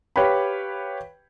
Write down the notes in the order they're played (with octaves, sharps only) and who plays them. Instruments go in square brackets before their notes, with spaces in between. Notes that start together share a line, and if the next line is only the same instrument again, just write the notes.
[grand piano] G4 B4 C#5 F5 G5 B5